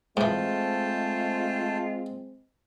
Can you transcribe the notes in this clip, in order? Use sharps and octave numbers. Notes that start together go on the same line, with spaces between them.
G#2 E3 G#3 A3 C4 F4 G5 A5